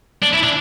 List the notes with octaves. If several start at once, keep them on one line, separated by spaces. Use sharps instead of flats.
D4
E4
D4